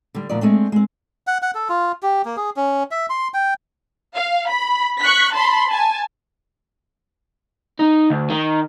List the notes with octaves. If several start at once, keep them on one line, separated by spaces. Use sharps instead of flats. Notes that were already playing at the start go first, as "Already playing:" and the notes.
D3 G3
D2 A#2 F3 D5
G#3 A3 C4 D4
G#3 C4
F#5
F#5
A4
F4
G4
A#3
G#4
C#4
E5
C6
G5
F5
B5
C#6 F#6 B6
A5 B5 C6
G#5 A5
D#4
D2
D#3